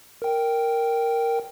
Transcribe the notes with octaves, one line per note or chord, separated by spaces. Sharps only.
A#4 G5